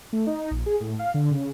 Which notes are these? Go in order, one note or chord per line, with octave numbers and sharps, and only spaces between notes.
A3
D#4
A#1
G#4
A2
F5
D3
C#3